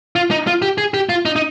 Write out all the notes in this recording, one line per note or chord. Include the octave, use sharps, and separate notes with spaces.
F4
D#4
F4
G4
G#4
G4
F4
D#4
D#4